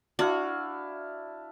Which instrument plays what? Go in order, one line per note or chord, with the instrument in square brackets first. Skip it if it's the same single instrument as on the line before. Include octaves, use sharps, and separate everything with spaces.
[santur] D4 E4 F5 [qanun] F#4